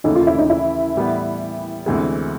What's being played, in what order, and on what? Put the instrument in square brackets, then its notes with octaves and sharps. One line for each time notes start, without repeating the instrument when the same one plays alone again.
[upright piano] D#2 C#3 E3 A3 [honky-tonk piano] D#4
[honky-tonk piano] F4
E4
D#4
E4
[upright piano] A2 E3 G3 B3
D2 C3 E3 G#3 B3